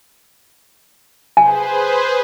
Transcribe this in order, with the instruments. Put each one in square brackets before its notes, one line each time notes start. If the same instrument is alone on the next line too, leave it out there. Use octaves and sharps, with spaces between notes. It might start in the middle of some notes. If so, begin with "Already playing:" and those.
[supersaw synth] G#4 B4 C5 [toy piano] G#5